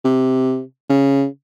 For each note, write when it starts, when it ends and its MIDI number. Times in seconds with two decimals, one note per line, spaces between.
0.04 0.62 48
0.90 1.25 49